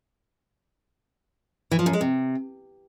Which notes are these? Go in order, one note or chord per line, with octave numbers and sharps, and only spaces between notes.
E3
F3
F#2
G#3
C3